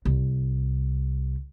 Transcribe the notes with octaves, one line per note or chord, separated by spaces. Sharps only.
C2